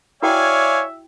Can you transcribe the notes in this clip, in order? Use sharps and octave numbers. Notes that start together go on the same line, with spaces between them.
E4 F#4 C#5 D5 E5 F5 G5 G#5